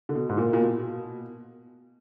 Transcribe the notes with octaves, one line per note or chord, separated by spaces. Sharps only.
D3
B2
G#2
A#2
A#2
B2